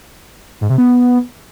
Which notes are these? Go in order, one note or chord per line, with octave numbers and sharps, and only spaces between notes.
G#2
C3
B3